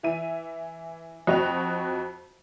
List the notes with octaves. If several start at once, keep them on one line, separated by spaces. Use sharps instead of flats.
E3 E5 D#7
F2 F#4 D#5 G5 F7